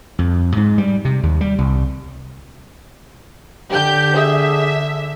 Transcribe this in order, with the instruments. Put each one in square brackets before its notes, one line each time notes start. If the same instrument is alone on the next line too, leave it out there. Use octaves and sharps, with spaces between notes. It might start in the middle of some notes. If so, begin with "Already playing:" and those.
[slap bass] F2
G#2
G3
C3
D#2
G3
C2
[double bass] D3 [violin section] G4 G6
[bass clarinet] G#4 [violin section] E5